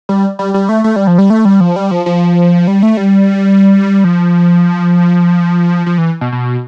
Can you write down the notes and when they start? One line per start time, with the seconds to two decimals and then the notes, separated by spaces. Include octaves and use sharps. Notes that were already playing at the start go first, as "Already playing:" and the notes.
0.09 G3
0.39 G3
0.54 G3
0.69 A3
0.84 A3
0.96 G3
1.07 F3
1.18 G3
1.30 A3
1.45 G3
1.60 F3
1.76 G3
1.91 F3
2.06 F3
2.67 G3
2.83 A3
2.97 G3
4.04 F3
5.86 F3
5.98 E3
6.21 B2
6.32 B2